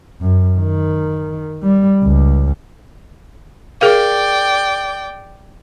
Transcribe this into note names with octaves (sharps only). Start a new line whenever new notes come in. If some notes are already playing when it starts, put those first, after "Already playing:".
F#2
D#3
G3
C#2
G#4 A#4 D5 F5 G5